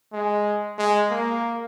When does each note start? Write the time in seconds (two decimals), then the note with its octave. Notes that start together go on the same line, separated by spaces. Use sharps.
0.13 G#3
0.78 G#3
1.11 A#3